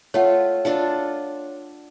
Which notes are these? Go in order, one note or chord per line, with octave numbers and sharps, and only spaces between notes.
A3 F4 C#5 F#5
D4 F4 A4